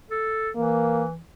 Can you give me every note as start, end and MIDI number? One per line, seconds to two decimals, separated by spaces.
0.11 0.50 69
0.56 1.19 52
0.56 1.04 58